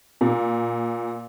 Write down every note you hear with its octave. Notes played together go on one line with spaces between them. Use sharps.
A#2